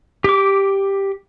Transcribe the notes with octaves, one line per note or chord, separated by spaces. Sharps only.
G4 D6